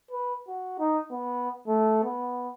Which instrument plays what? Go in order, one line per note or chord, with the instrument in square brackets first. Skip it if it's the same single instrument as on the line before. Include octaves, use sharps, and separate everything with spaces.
[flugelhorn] B4
F#4
D#4
B3
A3
B3